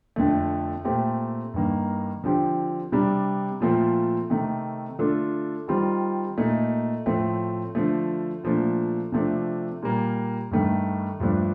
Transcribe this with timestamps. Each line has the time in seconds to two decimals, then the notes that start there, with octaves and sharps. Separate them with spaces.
0.16 F2 D3 A3
0.84 A#2 A3 C4 G4
1.54 G2 D#3 A#3
2.24 D3 F3 C4 G4
2.92 C3 G3 D4
3.60 A#2 F3 A3 C4 F4
4.30 C3 D#3 A3
4.99 D3 A3 D4 F4 A4
5.68 D#3 G3 C4 F4
6.37 A#2 A3 D#4
7.06 A2 F3 A3 C4
7.75 D3 F3 A3
8.43 A#2 F3 A3 D4
9.12 C3 F3 A3 D4
9.82 A#2 G3 A#3
10.51 G2 D#3 A3
11.20 G2 F3 A3 D4